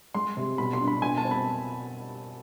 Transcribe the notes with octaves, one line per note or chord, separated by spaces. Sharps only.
G#3 C6
C3
B2 B5
C6
D4
B5
B2 G#5
A5
C4
B5